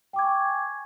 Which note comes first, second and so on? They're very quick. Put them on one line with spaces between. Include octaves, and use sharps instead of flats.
G5 D6 G#6 C#6 G#5